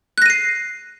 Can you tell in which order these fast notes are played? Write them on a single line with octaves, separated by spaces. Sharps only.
F#6 A#6 D#7 C7